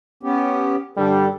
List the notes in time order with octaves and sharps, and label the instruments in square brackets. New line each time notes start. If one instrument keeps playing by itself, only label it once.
[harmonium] B3 C#4 G4
[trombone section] G2 D3 G3 [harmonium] D4 A4